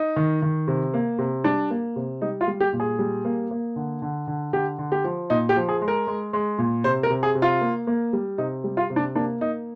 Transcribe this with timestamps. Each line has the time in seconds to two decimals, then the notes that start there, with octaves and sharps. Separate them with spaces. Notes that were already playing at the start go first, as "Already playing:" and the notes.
Already playing: D#4
0.16 D#3
0.42 D#3
0.68 C3
0.94 A#3
1.19 C3
1.44 G3 D4
1.70 A#3
1.96 C3
2.21 G3 D#4
2.41 F4
2.48 G3
2.60 G4
2.73 A#2
2.80 G#4
2.99 G3
3.25 A#3
3.51 A#3
3.76 D3
4.02 D3
4.27 D3
4.53 D3 G4
4.78 D3
4.92 G4
5.04 F3
5.30 A#2 D#4
5.49 G4
5.56 F3
5.69 G#4
5.81 G#3
5.88 A#4
6.07 G#3
6.33 G#3
6.58 A#2
6.84 C3 C5
7.03 A#4
7.10 C3
7.23 G#4
7.35 C3
7.42 F4
7.61 A#3
7.87 A#3
8.13 G3
8.38 C3 D#4
8.64 G3
8.77 F4
8.90 C3
8.96 D4
9.15 A#3 D4
9.41 A#3 D#4